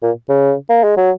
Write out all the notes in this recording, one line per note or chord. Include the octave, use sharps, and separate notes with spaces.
A#2
C#3
A#3
G#3
F#3